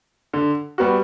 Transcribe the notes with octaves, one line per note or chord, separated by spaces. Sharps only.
D3
G3 B3 F#4